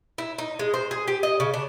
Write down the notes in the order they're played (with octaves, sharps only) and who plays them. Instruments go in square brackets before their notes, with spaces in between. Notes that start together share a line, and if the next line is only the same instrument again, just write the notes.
[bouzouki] E4
D#4
G#3
C5
G#4
G4
D#5
C#3
D4